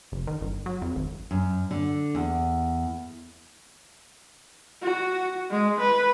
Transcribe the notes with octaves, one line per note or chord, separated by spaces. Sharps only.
F#1
D#3
G1
F#3
F2
G#1
F#2
D3
E2
F#4
G#3
B4